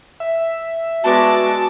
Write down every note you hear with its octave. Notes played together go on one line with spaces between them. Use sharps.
E5
G#3 B3 F#4 D5 A5